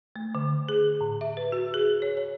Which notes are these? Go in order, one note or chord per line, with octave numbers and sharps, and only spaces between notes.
A3
D3
G#4
A2
E5
B4
F#4
G#4
C#5
C#5